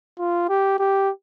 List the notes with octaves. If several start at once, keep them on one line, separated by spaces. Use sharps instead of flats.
F4
G4
G4